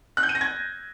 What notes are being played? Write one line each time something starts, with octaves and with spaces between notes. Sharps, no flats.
F#6
G6
D#7
A#6
G#6